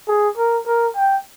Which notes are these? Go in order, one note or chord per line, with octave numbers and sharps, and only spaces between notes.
G#4
A#4
A#4
G5